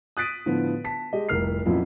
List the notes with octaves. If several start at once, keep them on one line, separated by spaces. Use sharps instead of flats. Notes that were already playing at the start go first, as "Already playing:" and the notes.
D#6 F#6 A6 B6 D7 D#7
A2 D3 F3 B3
A5 B6
G#3 G4 D#5
F1 C2 A#4 F6 C7
F2 A#2 F3 F#3 C#4 E4